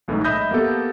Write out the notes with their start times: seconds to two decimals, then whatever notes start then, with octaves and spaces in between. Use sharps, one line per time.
0.08 B1 A2 E3 G#3 A3 D#4
0.24 D#5 E5 B5 D#6 G6 A#6
0.51 A#3 B3 G4 A4